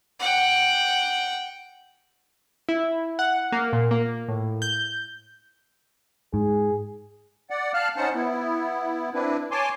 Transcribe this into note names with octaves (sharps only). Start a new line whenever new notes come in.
F#5 G5
E4
F#5
A#3
A#2
A#3
A2
G6
G#2 G#4
D5 F#5
F5 A5 F6 F#6
C#4 D#4 C5 F#5 A5
B3 E4
C4 D4 E4 B4
C#5 G#5 A5 C6 D6